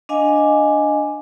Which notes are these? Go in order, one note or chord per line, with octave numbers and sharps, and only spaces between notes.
D4 D#5 F5 G#5